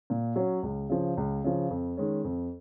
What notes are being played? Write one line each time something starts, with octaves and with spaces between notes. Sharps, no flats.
A#2
F#3 C#4
C#2
C#3 F3
C#2
C#3 F3
F2
D#3 G#3 C#4
F2